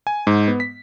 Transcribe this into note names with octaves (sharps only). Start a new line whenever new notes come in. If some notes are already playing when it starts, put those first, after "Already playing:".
G#5
G#2
B3
B6